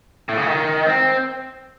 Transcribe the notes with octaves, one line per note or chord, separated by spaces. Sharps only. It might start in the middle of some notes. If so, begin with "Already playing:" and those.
A2
C#3
D#3
C4